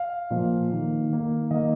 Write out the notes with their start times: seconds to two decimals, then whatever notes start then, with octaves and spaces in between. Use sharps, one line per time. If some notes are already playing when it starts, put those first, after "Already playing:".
Already playing: F5
0.30 A#2 F3 A#3
0.70 D#3 A#3
1.10 D#3 A#3
1.51 D#3 A#3 D#5